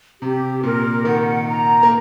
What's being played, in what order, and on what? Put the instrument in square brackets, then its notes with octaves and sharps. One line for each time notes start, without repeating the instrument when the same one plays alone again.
[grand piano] C3 [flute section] G4
[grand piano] A#2 [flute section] A#4
[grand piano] D#3 [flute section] F#5
[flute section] A#5
[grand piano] A#3